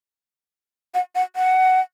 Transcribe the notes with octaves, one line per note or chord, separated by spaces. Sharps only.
F#5
F#5
F#5